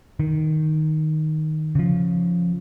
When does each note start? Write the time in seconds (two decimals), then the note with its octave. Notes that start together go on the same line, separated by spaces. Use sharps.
0.20 D#3
1.75 C#3 F3